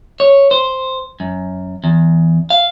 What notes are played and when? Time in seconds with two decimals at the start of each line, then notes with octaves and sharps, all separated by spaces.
0.20 C#5
0.51 C5
1.20 F#2
1.84 E2
2.50 F5